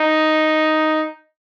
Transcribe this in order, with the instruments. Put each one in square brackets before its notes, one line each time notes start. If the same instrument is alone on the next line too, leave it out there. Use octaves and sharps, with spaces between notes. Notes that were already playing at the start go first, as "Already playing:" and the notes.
Already playing: [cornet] D#4